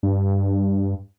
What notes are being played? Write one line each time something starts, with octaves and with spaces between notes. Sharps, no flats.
G2